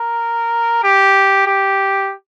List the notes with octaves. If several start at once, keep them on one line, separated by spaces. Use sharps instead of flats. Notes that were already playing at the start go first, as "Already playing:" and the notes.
Already playing: A#4
G4
G4